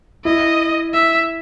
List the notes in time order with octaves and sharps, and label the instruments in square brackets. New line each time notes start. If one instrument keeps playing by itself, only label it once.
[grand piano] E4 [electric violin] D#5
[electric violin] E5